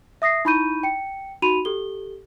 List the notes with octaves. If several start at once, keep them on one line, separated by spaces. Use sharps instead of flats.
E5 D#6 A#6 C7
D#4 E4 B5 C#6 G6 D#7
G5 C#7
D#4 F#4 B5 D#7 F7
G4 A4 G7